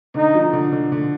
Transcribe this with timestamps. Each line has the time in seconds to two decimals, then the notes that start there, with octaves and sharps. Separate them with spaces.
0.15 D3 D#4
0.34 F3
0.53 D3
0.72 D3
0.92 D3